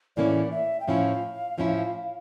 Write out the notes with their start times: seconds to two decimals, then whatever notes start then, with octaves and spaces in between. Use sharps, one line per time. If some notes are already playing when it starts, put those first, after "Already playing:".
0.16 A2 E3 A#3 C#4 E4 D5
0.51 E5
0.80 G5
0.88 A2 F3 C#4 E4 F5
1.58 A2 F3 C#4 E4